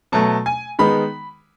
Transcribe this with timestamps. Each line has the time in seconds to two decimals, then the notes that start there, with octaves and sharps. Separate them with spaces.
0.12 B2 F#3 A3 A5
0.46 G#5
0.79 D#3 G#3 B3 D#4 B5